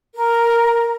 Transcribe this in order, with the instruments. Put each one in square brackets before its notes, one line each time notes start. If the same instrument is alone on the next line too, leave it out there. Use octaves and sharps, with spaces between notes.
[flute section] A#4